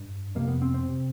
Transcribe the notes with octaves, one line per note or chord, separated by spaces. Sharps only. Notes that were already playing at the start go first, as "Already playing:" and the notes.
Already playing: G2
F2 C3 A#3
B3
C4
C4
C3